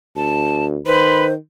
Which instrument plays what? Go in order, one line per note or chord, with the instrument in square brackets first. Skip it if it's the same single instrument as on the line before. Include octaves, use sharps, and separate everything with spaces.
[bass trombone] D2 [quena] A5
[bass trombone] D#3 [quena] B4 [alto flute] C5 [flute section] B5 C6